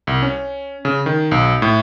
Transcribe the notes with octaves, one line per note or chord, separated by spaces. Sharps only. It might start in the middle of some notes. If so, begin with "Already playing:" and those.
C2
C#4
C#3
D#3
B1
A2